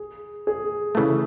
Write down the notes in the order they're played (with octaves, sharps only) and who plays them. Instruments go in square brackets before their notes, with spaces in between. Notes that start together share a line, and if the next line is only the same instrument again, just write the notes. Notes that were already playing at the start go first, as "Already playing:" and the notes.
Already playing: [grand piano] G#4
G#4
[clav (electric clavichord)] C#3 E3 A3